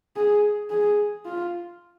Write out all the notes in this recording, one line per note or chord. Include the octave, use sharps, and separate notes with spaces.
G#4
G#4
F4